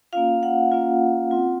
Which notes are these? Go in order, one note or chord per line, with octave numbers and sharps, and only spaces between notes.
A#3 C#4 F4 F5
F#5
A#3 C#4 F4
C4 F4